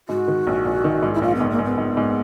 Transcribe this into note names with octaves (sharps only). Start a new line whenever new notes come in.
G#2 F#4
D#3
A#1
A#1
D#3
G#2
E4
A#1 F4
B3
G#2
A#3
G#2
B3
G#2
G#2